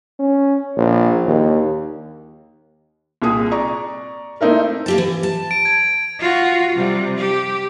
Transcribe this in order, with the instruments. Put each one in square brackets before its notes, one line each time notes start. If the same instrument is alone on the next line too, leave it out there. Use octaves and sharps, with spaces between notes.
[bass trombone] C#4
A#1
D#2
[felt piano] C2 A#2 G#4 D#6
D5 A#5 C#6
A3 A#3 C4 D#4 E4 A#4
[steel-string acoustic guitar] A#3 G4 A5
E3
A5
[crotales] D7
G#6
[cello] F4 F#4
C3 G3
G4